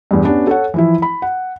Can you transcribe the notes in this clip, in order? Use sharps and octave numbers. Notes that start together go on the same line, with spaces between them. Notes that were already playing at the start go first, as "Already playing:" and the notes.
E2 G2
B3 C#4 D4 G4
A4 C#5 F#5
E3 F3 E4
B5
F#5